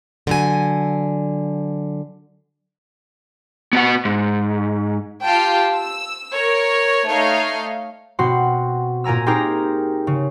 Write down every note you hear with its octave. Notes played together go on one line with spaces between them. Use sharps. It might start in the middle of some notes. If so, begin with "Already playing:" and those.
D3 F#3 G#5
B3 F#4 F#5
G#2
F4 G4 F5 G5 A5
E6
A#4 C#5
A3 D#4 C#5 F5
B2 C4 F#4 C6
A#2 A#4 G#5 A#5 E6
C4 D#4 G4 G#4 A#4 A#5
C#3